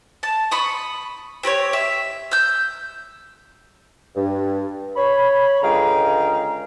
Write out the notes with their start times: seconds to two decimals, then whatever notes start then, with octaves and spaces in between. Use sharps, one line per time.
0.23 A5
0.51 B5 C#6 D#6
1.43 C4 G4 C5 C#5
1.73 E5
2.31 E6 G6
4.16 G2
4.96 C#5 B5
5.62 C#2 D3 G#3 F5 G5 A#5